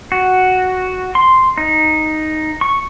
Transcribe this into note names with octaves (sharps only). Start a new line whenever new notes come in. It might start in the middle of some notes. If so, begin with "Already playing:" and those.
F#4
C6
D#4
C#6